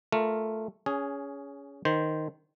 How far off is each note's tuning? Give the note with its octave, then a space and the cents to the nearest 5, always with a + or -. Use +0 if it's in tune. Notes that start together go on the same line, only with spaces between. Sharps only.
A3 +0 F4 +0 A#4 -5
C#4 +20 G#4 +0
D#3 +0 C5 +0